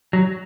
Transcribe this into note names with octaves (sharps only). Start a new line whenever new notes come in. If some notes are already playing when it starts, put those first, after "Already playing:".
F#3